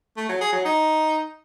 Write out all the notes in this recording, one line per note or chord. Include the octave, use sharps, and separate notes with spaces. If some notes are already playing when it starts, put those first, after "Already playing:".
A3
F#3
G#4
F#3
D#4